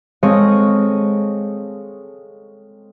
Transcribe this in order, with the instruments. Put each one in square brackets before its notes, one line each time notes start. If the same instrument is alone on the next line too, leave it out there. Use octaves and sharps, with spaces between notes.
[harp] G#3 C4 A4 C#5 D#5 F5